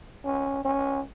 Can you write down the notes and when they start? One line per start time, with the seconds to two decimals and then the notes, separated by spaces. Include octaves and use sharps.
0.24 C#4
0.65 C#4